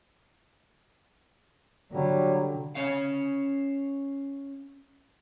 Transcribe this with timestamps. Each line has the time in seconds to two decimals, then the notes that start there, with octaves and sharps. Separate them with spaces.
1.92 D3 F#3 G3
2.75 C#4 C#5 F5